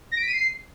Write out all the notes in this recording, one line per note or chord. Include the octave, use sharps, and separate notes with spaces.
A#6
D7
B6
D#7
C7